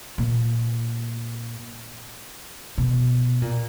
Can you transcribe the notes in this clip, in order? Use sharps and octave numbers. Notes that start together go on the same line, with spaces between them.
A#2
B2
A#2